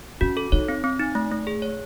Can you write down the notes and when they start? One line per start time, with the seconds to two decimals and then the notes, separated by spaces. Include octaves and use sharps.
0.21 C#4 F#4
0.37 A4
0.52 D#4 C#5
0.68 C4
0.84 C4
0.99 D#4
1.15 A3
1.32 A3
1.47 G#4
1.62 C#5